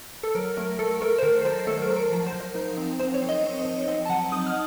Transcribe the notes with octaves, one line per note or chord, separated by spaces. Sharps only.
A4
F#3 A#4
A3 A#4
A3 A4
A3 A#4
C5
D#3 A#4
F#3 C5
A3 A4
A#4
F#3
A#4
F3 A#4
C5
F3
C5
D#4
C4
C4 C5
C#5
C4
D#5
C4
F3
C4 D#5
A5
F#3 F#5
D#4 D#6
F6